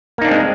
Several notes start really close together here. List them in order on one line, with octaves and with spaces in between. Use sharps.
A#3 D#4 D4 C4 G#3